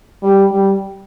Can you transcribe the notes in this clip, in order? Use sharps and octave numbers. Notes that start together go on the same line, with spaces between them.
G3
G3